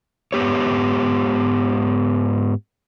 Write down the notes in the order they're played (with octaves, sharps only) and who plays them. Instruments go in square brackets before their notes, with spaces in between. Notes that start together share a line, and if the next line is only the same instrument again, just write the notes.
[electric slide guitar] G#2 B3 G4 C#5